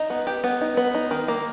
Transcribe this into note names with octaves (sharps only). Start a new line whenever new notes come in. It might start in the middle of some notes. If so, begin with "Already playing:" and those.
Already playing: D#4
B3
G4
B3
D#4
B3
D#4
D#3
A#3